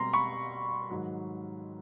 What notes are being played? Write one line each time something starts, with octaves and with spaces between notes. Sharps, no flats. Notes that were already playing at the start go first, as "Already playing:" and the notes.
Already playing: B2 G3 C4 A#5 C6
B5 C#6
G#2 D#3 F#3